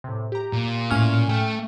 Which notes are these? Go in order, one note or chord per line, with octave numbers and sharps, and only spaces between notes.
A2 C3
G4 A#5
A#2
A2 C#4 G#5 F6
A3 G5